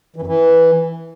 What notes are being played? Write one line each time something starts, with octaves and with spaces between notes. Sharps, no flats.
E3
F#2
E3